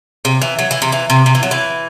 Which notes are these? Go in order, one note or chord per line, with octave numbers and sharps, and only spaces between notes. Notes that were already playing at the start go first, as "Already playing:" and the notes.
C3
E3
F#3
E3
C3
E3
C3
C3
E3
F#3
E3